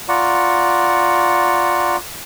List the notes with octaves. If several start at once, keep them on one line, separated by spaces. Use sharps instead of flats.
F4 D5 F#5 A#5 C#6